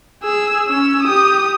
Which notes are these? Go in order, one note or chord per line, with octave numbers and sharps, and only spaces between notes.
G#4 E6
C#4 E6
G4 D#6